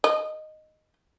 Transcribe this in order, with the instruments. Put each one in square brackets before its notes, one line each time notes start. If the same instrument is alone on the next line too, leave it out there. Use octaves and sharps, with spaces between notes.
[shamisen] D#5